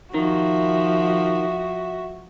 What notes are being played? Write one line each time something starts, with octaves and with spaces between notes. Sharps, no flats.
D#3 F3 F#4 E5